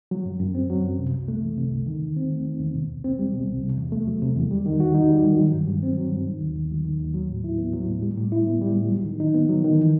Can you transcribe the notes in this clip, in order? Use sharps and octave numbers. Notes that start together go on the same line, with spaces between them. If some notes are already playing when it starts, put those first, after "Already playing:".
F#3
F#2
F#2
C4
F#3
F#2
C3
C2
A3
E3
C3
C2
D#3
E2
C4
A3
D#3
E2
B2
C2
C4
G3
B2
C2
C3
E2
A3
F#3
C3
E2
G3
D#3
F#4
D#4
G3
D#3
F#3
G2
G2
C4
F#3
G2
D#3
D#2
D#2
F#3
D#3
D#2
F#3
A2
E4
B3
F#3
A2
G3
A2
E4
B3
G3
A2
F#3
D#3
D#4
B3
F#3
D#3
E3